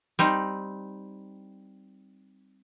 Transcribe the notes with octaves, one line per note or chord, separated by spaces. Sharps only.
G3 C4 D#4